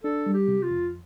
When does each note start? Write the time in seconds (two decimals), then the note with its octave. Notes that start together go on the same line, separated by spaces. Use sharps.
0.04 D4 A4
0.26 G3
0.34 G4
0.48 C3
0.63 F4
0.70 F2